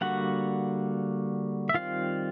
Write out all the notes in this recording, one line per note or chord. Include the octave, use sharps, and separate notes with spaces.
D3 G3 A#3 F#4 F#5
E5
D#3 G3 C4 F4 F5